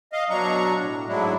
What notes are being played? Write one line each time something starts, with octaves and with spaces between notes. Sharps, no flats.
D#5 F5
B2 F#3 D4 A#5 C#6
A2
G#2 F#3 G#3 A3 D4 E4